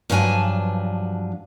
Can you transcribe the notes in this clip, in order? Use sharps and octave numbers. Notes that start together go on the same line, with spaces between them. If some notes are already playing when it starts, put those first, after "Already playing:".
G2 F3 F#3 D4 G#5 A5